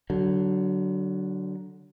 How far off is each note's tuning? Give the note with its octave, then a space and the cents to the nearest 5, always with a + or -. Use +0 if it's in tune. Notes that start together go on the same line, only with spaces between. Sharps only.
D3 +0 F#3 +25